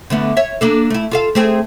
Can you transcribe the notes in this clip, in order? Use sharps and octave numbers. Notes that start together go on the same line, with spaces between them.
D3 A3 B3
C#5 E5
A#3 D4 A4
A3 E4
F4 A4 F5
A3 C4 G#4